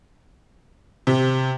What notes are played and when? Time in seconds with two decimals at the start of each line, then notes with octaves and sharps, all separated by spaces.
1.07 C3